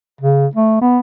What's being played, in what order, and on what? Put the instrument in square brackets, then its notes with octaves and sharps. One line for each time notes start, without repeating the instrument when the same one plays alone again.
[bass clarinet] C#3
A3
B3